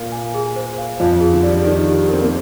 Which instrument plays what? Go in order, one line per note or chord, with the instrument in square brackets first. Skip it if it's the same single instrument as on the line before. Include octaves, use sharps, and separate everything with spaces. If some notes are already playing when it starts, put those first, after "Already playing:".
Already playing: [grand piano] A#2 A#3 [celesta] A#4 F5
[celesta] G#5
G#4
C5
F5
[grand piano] F2 F3 [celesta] F4
[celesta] G#4
[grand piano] D3
[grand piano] G3 [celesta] D5
[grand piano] F3
[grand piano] D#3 [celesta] D5
[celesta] G4
[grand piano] C4 [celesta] A#4
[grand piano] A#3